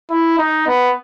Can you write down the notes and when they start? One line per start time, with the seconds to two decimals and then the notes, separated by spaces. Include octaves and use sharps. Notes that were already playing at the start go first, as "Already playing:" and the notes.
0.10 E4
0.39 D#4
0.67 B3